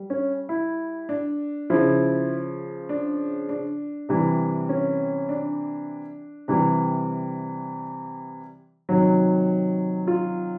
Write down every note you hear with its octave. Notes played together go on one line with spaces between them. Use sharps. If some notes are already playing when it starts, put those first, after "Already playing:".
Already playing: G3
C#4
E4
D4
C#3 F3 E4
D4
D4
C3 E3 G3
C#4
D4
C3 E3 G3
C3 D#3 F#3
F4